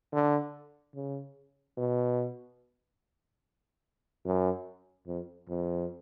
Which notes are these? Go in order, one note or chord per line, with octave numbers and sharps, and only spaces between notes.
D3
C#3
B2
F#2
F2
F2